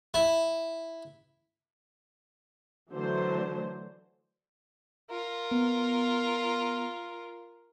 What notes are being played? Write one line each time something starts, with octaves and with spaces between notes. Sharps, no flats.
E4
D3 E3 F#3 A3 C5
F4 A#4
B3